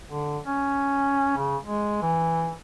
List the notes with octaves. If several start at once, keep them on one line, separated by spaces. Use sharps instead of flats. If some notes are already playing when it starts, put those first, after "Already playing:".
D3
C#4
C#3
G#3
E3